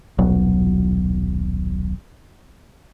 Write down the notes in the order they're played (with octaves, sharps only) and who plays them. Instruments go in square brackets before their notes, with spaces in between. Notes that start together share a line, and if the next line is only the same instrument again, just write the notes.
[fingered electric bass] D#1 B1 F#3